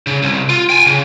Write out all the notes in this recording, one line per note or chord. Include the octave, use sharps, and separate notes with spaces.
C#3
C2
F4
G5 G#5
C#3